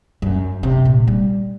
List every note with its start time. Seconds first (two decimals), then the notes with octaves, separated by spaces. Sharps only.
0.22 F#2
0.63 C3
0.85 A#2
1.08 G3